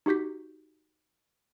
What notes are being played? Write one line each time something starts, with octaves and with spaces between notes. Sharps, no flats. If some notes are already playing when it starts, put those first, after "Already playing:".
D#4 F#4 G4 G6 B6